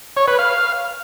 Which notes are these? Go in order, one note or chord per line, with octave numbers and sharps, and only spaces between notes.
C#5
B4
F5